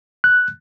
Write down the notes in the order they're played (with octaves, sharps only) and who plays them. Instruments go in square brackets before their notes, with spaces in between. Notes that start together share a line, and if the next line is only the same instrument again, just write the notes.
[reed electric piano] F#6